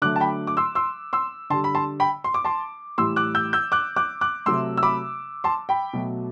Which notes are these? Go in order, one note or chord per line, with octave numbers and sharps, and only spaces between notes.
D3 F#3 A3 D6 F#6
A5
G5 B5
D6
C6 E6
C6 E6
C6 E6
D3 G3 A5 C6
B5
A5 C6
G5 B5
C6
D6
A5 C6
A2 E3 G3 C6 E6
D6 F#6
E6 G6
E6 G6
D6 F#6
D6 F#6
D6 F#6
C3 F#3 A3 C6 E6
E6
B5 D6
A5 C6
G5 B5
B2 F#3 A3